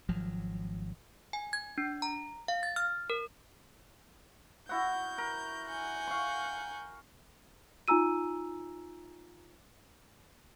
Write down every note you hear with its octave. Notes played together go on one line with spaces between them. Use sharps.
G#1 F3 F#3
G#5
G#6
D4
A#5
F5
A6
F6
A#4
E4 F#4 F#5 G6
A#4
F#5 G#5 G6
F5 C#6
D#4 F4 G#5 A#5 E6 D#7